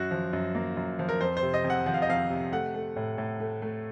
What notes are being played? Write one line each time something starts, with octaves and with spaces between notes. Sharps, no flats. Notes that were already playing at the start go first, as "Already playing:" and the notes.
Already playing: F#2 F#4
F3
F#2
A#3
F#2
F3
A#4
F2 C5
C5
C3
D#5
F2
F#5
F3 F#5
F5
D#5
F2 F5
C3
A3 F#5
A3
A2
A2
A3
A3